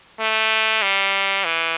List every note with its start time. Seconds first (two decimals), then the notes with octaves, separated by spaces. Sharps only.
0.20 A3
0.82 G3
1.45 E3